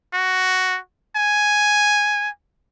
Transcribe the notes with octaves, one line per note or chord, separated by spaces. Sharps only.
F#4
G#5